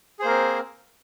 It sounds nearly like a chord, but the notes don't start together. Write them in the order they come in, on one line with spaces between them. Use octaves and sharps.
G#4 C5 A#3 A#4 C4